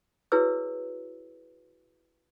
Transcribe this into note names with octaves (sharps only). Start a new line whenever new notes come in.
E4 F#4 G#4 B4 C#5 E6